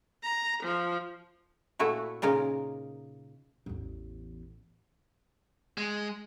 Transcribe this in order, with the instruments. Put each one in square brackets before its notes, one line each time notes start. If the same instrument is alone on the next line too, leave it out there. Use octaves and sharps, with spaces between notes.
[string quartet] A#5
F3
[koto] A#2 A3 E4 F#4
A#2 C#3 D#4 A#4
[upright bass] A1 E2
[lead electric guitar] G#3